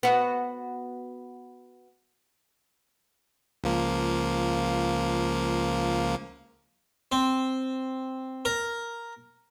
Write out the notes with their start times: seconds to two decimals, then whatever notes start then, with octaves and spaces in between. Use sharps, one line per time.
0.03 B3 F#4
3.64 C#2 F3 A#3
7.12 C4
8.45 A#4